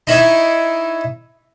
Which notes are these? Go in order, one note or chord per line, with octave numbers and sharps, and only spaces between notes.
D#4 E4 C#5 E5